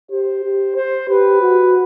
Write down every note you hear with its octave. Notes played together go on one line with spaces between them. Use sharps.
G4 C5
G4
C5
G4 B4
F#4